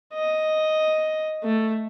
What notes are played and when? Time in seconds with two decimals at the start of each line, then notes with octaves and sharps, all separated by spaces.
0.14 D#5
1.43 A3